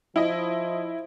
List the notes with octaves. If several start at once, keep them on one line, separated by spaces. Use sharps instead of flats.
F3 E4 D#5